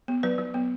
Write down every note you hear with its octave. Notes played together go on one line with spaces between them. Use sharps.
B3
F#3 B4
F#3
B3